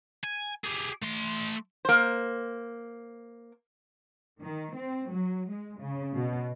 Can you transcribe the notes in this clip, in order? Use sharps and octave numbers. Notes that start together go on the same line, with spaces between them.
G#5
G4 G#4
A3 C6
A#3 C5
D#3
C4
F#3
G#3
C#3
B2